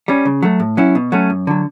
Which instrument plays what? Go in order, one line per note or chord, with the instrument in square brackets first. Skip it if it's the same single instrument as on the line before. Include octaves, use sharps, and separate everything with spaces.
[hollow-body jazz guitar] G3 C#4
C#3
F#3 A3
A2
F#3 C#4 E4
B2
F#3 A3 C#4
F#2
D3 F#3